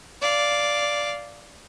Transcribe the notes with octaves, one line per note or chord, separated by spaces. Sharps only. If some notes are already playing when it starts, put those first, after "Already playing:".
D5 F5